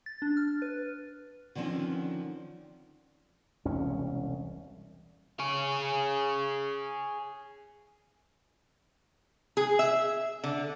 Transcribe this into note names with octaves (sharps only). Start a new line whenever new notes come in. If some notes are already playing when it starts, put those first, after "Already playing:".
A6
D4
F6
B4
D3 D#3 F3 A3 C4 C#4
E1 C2 C#4
G#4 C#5
G#4
E5
D3